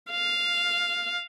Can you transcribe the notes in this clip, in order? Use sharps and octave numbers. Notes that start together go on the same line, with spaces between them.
F5